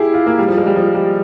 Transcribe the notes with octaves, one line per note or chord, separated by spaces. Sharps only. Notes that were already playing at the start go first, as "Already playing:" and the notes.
Already playing: E4 G4 G#4
F4
A#3
G3
F3
G#3
G3
F3
G3